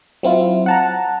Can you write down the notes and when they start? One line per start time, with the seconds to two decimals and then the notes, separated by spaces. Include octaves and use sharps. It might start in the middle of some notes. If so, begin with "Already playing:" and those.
0.23 F#3 C4 E4 F4
0.66 F#5 A5 A#5